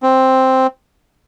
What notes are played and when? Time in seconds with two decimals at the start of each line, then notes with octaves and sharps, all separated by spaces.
0.03 C4